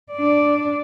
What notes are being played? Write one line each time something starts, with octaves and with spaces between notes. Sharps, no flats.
D4 D5